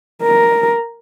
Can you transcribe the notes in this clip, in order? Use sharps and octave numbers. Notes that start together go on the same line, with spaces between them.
A#4